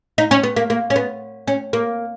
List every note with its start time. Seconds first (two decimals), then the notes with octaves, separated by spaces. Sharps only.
0.18 D#4
0.31 C#4
0.43 B3
0.56 A#3
0.70 A#3
0.90 C#4
0.96 B3
1.47 C#4
1.73 A#3